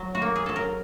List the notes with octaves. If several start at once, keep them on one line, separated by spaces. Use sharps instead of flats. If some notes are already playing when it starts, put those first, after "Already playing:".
Already playing: F#3
F#4
A#3
G#4
F#3 A4
A#4